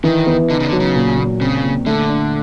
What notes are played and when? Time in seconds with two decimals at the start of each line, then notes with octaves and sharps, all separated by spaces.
0.04 D#3 E3
0.26 B3
0.49 D3 D#4
0.60 C#3
0.65 D3
0.73 F#3
0.80 C#3
0.95 A#2
1.18 A#2
1.41 C#3 C4
1.63 A#2
1.86 D3 A3
2.09 D4